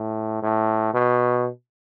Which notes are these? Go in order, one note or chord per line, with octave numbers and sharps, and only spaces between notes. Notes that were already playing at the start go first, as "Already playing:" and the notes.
Already playing: A2
A2
B2